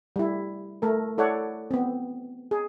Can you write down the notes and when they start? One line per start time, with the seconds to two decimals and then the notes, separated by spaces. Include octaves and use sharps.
0.16 G3 E4
0.82 A3 A4 A#4
1.18 E4 A4 C#5 D5 F#5
1.71 B3 C4
2.51 G#4